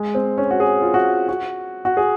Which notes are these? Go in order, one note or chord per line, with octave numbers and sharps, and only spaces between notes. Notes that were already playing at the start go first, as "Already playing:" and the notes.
Already playing: G#3
C4
C#4
F#4
G#4
F4
F#4
F#4
F#4
G#4